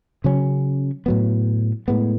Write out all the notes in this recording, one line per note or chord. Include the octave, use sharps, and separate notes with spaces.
C#3 F#3 C#4
A2 F#3 B3
A2 G#3 B3